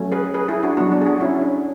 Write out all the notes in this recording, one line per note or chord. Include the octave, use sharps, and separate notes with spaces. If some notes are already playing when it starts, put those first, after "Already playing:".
Already playing: F#3 A3 C#4
G#4 B4
G#4 B4
E4 G#4
D4 F#4
F#3 B3 D4 F#4
D4
G#4
D4 F#4
C#4 E4
D4